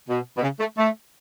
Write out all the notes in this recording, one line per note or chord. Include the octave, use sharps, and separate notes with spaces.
B2
B2
C#3
A3
A3